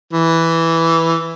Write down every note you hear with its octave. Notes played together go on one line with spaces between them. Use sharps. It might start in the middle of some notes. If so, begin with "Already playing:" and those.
E3